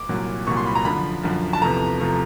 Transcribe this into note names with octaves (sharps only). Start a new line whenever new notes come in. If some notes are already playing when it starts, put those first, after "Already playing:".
Already playing: D6
C2 A#2 F#3
C2 A#2 F#3 C#6
C6
B5
A#5
F#2 D3 F3 B5
F#2 D3 F3
A5
E2 C3 F3 A3 A#5
C3 F3 A3